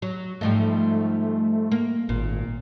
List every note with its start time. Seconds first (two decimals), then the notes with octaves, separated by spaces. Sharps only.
0.02 F#3
0.41 G#2 F3 G3 A3
1.72 A#3
2.09 G#1 A#2